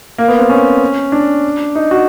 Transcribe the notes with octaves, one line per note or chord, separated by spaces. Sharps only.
A#3
B3
C4
C#4
D4
D#4
F#4